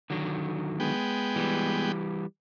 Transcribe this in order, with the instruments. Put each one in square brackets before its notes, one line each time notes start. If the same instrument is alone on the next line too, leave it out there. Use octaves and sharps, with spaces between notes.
[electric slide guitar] D3 D#3 F#3
[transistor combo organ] G#3 B3 G5
[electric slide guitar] E3 G3